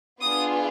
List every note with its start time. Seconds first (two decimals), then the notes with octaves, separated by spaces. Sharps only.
0.21 B3 D4 F4 G#4 D#6